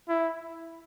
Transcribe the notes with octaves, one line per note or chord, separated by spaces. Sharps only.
E4